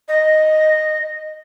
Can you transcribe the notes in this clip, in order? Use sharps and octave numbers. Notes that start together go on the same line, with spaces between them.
D#5